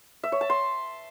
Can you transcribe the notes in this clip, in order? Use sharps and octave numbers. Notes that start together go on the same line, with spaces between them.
E5
C#5
A5
C6